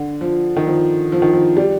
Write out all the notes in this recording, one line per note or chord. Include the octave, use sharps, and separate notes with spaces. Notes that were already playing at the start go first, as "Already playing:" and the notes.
Already playing: D3
F3
D#3
F3
F3
D#3
F3
G3